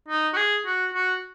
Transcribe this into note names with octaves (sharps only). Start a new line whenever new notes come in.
D#4
F#4
G#4
F#4
F#4